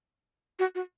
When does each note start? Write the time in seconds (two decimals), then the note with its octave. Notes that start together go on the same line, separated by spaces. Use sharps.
0.59 F#4
0.75 F#4